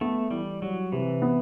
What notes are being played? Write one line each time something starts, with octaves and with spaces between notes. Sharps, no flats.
A3 B3
E3 G3
F#3 G3
C3 E3
B3